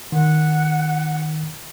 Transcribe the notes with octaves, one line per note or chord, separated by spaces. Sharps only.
D#3 F#5